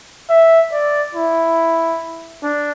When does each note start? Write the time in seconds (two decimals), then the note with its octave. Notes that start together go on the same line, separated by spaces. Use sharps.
0.30 E5
0.72 D5
1.15 E4
2.43 D4